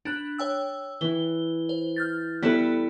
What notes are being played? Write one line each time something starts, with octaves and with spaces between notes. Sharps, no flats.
D4 B5 F#6
C#5 G5 E6
E3 G7
C5
F6 G6 A6
G3 B3 E4 A4